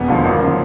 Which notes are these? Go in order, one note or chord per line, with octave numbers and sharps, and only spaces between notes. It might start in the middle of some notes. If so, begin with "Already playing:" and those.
Already playing: E1 B3
D#2 D3 F3
G#1 A#3
C#3 F3